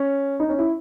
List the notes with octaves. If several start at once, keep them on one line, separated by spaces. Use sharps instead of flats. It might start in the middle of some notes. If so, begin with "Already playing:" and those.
Already playing: C#4
D#4
C#4
E4